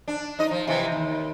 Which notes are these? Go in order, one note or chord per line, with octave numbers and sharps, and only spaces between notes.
D4
D#4 D#5
F3
C3 E3
D#2